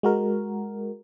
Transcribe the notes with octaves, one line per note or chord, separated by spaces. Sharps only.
G#3 F#4 A#4